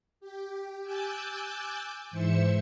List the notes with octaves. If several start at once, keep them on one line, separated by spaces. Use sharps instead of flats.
G4
G#5 D6 E6 F#6 G6 A6
G#2 E3 C5 E5 E6 C#7